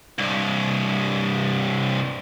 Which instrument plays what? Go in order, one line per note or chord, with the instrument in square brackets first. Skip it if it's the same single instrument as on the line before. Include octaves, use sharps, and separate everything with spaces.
[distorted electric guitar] C2 G2